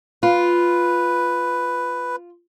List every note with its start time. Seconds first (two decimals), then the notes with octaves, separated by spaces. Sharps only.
0.23 F4 B4